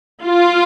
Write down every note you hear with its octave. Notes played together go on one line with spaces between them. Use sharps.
F4